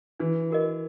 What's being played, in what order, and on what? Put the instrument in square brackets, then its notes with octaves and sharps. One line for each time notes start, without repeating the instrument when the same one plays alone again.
[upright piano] E3 [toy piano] D4
[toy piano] F#4 A#4 D#5